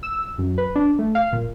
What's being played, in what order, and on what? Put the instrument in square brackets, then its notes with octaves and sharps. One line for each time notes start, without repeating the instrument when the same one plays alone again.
[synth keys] E6
F#2
B4
D4
A3
F5
A#2